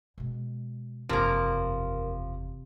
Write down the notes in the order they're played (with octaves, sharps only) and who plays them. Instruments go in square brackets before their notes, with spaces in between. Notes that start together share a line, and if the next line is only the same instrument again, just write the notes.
[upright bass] B2 G#3
[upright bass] F#1 E2 [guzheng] C3 [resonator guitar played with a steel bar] F3 A#3 [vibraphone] A#4